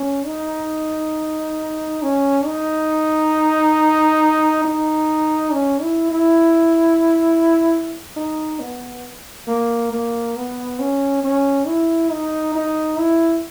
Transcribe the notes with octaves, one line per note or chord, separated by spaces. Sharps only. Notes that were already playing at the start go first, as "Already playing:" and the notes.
Already playing: C#4
D#4
C#4
D#4
D#4
C#4
E4
E4
D#4
B3
A#3
A#3
B3
C#4
C#4
E4
D#4
D#4
E4